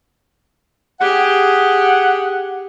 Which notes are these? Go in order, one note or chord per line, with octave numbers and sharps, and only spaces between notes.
G4 G#4 F#5